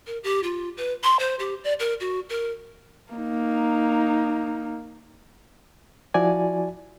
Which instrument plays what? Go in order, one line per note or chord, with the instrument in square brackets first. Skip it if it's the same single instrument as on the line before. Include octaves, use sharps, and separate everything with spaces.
[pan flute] A#4
G4
F4
B4
C6
C5
G4
D5
A#4
F#4
A#4
[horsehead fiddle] A#3 D#4
[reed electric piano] F3 E4 F#4 D5 G#5